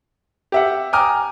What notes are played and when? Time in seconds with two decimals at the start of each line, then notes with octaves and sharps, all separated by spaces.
0.52 G4 E5 F#5
0.93 G5 G#5 A#5 D6 D#6 F6